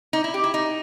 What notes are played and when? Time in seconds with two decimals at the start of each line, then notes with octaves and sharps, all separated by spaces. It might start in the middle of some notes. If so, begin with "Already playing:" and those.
0.13 D#4
0.24 E4
0.34 G4
0.44 E4
0.54 D#4